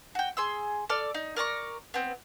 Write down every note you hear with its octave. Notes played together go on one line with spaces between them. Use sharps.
F#4 G5
G#4 C6 E6
A4 D5 D6 F6
D#4
A#4 D5 A#5 C#6
B3 C4